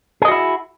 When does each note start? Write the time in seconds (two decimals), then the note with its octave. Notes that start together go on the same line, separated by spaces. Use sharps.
0.22 G#4
0.25 D#5
0.28 F#4
0.32 E4